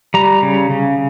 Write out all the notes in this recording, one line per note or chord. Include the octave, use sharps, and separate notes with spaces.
G3 A#5
C#3
C#3